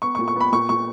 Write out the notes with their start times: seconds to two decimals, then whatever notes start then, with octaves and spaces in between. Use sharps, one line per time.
0.02 B3 C#6
0.15 C#6
0.19 A#2
0.28 C#6
0.36 B3 B5
0.52 A#2 C#6
0.69 A#2 C#6